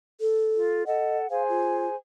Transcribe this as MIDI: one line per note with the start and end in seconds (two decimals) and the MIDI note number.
0.21 0.83 69
0.56 0.86 65
0.86 1.29 69
0.86 1.18 75
0.86 1.29 78
1.30 1.95 68
1.30 1.95 72
1.30 1.43 77
1.30 1.95 80
1.49 1.87 65